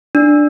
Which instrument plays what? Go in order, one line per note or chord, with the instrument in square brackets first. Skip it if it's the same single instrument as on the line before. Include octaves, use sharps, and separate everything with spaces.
[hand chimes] D4